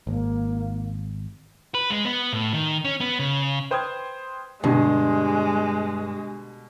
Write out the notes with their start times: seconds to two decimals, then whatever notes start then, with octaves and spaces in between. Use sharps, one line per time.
0.07 G#1 A#3
1.74 B4
1.90 G#3
2.05 B3
2.33 A2
2.53 D#3
2.85 C#4
3.01 B3
3.20 C#3
3.71 B4 C5 G5 D#6 F6 G#6
4.64 G2 B2 D3 G#3